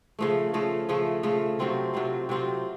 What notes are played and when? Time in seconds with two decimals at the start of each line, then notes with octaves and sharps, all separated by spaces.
0.19 C#3 F3 A3
0.54 C#3 F3 A3
0.89 C#3 F3 A3
1.23 C#3 F3 A3
1.59 C3 F#3 C4 F4
1.94 C3 F#3 C4 F4
2.29 C3 F#3 C4 F4